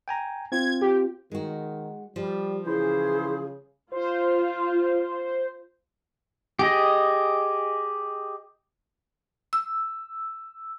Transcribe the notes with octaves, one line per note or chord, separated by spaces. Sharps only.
G5 G#5 A#5
C4 F4 G#6
G4
D#3 G#3 F#4
F3 G3
C#3 E3 E4 G#4 C5
F4 C5
G4 G#4 D#5
E6